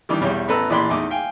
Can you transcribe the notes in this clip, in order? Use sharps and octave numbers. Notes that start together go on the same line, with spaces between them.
D#3 E3 G3 D4
B1 E2 G3 C#5
A1 B3 A4 B4 A#5 E6
A#1 E3 D5 B5 C6
E2 A3 D#4 D6
F5 G5 G#5